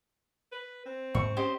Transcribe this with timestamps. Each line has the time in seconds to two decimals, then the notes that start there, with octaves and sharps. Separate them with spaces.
0.52 B4
0.86 C4
1.15 G#2 C#6
1.37 C#4 G4 C5 D#5